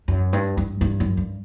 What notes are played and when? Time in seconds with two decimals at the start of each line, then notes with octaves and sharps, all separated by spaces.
0.08 F#2
0.33 G2
0.57 G2
0.81 G2
1.00 F#2
1.17 G2